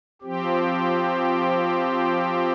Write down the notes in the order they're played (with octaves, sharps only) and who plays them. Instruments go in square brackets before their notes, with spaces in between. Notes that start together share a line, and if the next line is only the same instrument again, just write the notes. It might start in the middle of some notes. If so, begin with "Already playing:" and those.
[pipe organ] F3 C4 G4